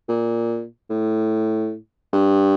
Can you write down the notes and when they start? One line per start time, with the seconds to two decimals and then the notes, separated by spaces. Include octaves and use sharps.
0.08 A#2
0.90 A2
2.13 G2